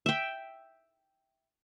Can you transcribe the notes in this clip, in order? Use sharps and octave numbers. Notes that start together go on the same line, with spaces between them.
E5 G5